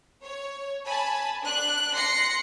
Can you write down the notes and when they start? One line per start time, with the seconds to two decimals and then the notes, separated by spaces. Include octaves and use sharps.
0.23 C#5
0.86 G#5 A5 B5
1.41 D4 F#6
1.94 C6 A#6 C7 C#7